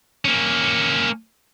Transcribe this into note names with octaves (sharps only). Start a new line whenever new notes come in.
A#3 C#4